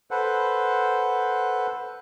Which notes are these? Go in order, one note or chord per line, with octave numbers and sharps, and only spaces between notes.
A4 B4 C5 F#5